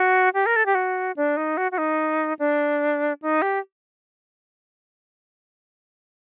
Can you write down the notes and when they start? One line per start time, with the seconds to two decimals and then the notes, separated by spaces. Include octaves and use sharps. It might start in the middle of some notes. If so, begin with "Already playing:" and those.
Already playing: F#4
0.34 G4
0.46 A#4
0.56 A4
0.66 G4
0.75 F#4
1.17 D4
1.37 D#4
1.57 F#4
1.72 F#4
1.78 D#4
2.39 D4
3.22 D#4
3.42 G4